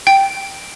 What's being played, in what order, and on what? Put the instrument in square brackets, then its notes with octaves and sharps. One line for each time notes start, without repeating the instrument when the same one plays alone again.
[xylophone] G5